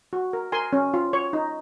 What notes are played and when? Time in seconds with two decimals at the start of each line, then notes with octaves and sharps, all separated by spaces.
0.13 F#4
0.33 A#4
0.52 A#4 G#5 C6
0.73 C#4
0.94 F4
1.13 C#5
1.33 D#4